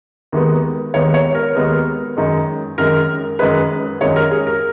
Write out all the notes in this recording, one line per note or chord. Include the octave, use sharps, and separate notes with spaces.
D#2 D#3 G#3 B3
D#2 D#3 G#3 B3 C#5
C#5
A#4
D#2 D#3 G#3 B3
F#2 D#3 G#3
F#2 D#3 G#3 A#4
F#2 D#3 G#3 B4
F#2 D#3 G#3 C#5
A#4
G#4
A#4